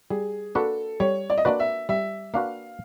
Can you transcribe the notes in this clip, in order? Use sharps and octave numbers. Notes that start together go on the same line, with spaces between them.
G3 G#4
A#3 D4 F#4 A4 B4
G3 C#5
D5
D#5
A#3 D4 F#4 B4 D5
E5
G3 E5
A#3 D4 F#4 B4 F5